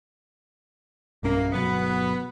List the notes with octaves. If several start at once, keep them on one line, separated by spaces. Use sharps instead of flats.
B1 G2 A#3 C#4
G1 B2 F#3 B3